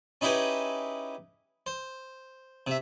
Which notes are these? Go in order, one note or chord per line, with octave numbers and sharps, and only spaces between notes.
C#4 D#4 E4 G4 G#4 B4
C5
C3 E5